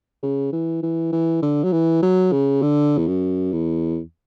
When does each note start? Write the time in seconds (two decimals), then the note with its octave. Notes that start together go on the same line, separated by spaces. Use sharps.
0.23 C#3
0.52 E3
0.83 E3
1.12 E3
1.42 D3
1.63 F#3
1.72 E3
2.02 F#3
2.32 C#3
2.62 D3
2.98 E2
3.07 F#2
3.52 E2